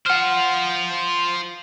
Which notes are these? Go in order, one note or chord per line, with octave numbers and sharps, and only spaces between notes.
F4 C5 F#5 F6